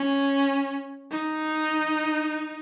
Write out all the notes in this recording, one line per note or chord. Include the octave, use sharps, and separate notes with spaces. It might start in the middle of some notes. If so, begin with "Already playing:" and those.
Already playing: C#4
D#4